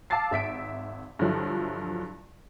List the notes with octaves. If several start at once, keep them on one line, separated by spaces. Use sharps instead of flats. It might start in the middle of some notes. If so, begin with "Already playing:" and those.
F5 A5 D6 E6 A6 C7
G#1 E5 B6 D7
G2 D3 F3 F#3 E4